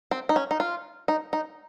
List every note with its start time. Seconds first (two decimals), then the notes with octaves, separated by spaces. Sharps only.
0.11 C4
0.29 D#4
0.36 C#4
0.51 D#4
0.60 F4
1.08 D#4
1.33 D#4